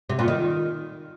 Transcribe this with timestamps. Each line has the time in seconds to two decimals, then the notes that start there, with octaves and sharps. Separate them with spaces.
0.09 C3
0.19 A#2
0.28 D#3